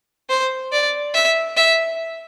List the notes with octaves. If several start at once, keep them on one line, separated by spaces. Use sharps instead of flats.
C5
D5
E5
E5